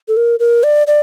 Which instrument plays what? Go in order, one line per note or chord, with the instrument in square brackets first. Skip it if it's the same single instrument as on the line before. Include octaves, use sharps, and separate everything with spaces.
[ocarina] A4
A#4
A#4
D5
D5